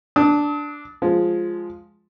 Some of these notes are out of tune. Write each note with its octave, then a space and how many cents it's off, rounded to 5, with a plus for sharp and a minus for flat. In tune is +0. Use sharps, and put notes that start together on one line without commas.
D4 +0 D#6 +45
F3 +0 G#3 +0